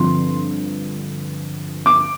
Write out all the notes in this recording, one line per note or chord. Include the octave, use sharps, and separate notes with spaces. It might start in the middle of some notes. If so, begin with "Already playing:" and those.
Already playing: G2 D3 F3 C4 C6
D6